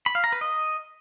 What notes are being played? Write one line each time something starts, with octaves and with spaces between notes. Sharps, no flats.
B5
F5
A#5
B4
D#5